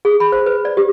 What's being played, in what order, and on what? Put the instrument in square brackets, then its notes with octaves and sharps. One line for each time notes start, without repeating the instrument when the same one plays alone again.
[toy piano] G#4
B5
C5
B4
D5
G4